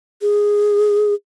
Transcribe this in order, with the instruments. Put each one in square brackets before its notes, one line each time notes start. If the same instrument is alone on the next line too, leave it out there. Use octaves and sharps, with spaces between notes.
[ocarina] G#4